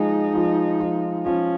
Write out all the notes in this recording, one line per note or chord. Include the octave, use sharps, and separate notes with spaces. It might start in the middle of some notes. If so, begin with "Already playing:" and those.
Already playing: F3 G#3 D#4
F3
F3
F3 C#4